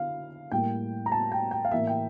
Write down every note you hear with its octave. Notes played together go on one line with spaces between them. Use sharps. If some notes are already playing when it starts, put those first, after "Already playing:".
Already playing: D3 E4 F5
A2 G3 A#3 G5
A#5
A5
G5
G5
F5
A2 E3 A#3 E5
G5